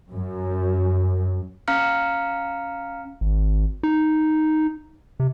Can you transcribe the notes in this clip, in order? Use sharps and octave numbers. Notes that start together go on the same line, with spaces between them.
F#2
C#4 F5 A#5 F6 C#7
G#1
D#4
C3